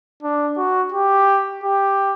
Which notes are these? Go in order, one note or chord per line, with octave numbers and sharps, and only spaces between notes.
D4
F#4
G4
G4